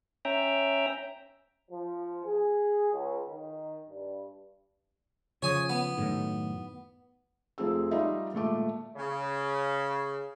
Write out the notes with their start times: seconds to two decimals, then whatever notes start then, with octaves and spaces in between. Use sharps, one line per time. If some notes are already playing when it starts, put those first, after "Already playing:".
0.25 C#4 E5 G5 A#5
1.70 F3
2.24 G#4
2.92 C#2
3.28 D#3
3.88 G2
5.42 C#3 F3 C#5 G#5 D#6
5.69 B3
5.97 F#2 A2 D#3
7.58 F1 F3 C4 G#4 E6
7.91 G3 D#4 F4 D#5 E5
8.33 G#1 A#2 A3 D6
8.96 C#3